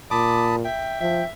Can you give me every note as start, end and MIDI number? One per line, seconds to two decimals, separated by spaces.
0.11 0.66 46
0.11 0.56 81
0.11 0.56 83
0.11 0.44 86
0.11 0.56 87
0.65 0.99 76
0.65 1.25 79
1.01 1.22 53
1.01 1.28 76